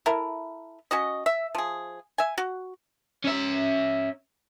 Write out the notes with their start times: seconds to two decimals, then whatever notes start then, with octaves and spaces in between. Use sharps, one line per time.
0.06 E4 A4 A#4
0.91 C#4 F#4 D#5
1.26 E5
1.55 F3 G#4
2.18 E5 G#5
2.38 F#4
3.25 C#4 E5